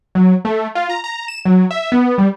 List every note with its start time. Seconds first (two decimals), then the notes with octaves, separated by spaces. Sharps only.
0.15 F#3
0.45 A3
0.75 F4
0.89 A#5
1.04 A#5
1.28 E7
1.45 F#3
1.71 E5
1.92 B3
2.18 G3